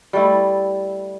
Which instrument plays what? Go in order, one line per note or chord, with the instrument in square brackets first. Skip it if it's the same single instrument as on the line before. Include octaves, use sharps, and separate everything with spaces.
[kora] G3 A3 E4